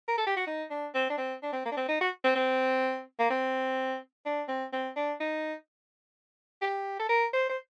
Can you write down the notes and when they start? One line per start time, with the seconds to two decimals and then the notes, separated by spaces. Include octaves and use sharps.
0.08 A#4
0.18 A4
0.27 G4
0.37 F#4
0.47 D#4
0.70 D4
0.94 C4
1.10 D4
1.18 C4
1.43 D4
1.53 C4
1.65 A#3
1.72 D4
1.77 C4
1.88 D#4
2.01 F#4
2.24 C4
2.35 C4
3.19 A#3
3.30 C4
4.26 D4
4.48 C4
4.73 C4
4.96 D4
5.20 D#4
6.62 G4
6.99 A4
7.09 A#4
7.33 C5
7.49 C5